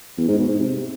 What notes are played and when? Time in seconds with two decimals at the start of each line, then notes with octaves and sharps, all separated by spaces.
0.18 E2
0.28 G#2
0.38 B2
0.49 G#2
0.59 C3